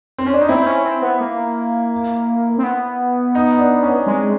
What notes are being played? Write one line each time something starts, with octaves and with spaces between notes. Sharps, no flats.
C4
C#4
D4
D#4
C4 E4
C4
C#4
C4
B3
A#3
C4
B3
D#4
D4
C#4
G#3 C4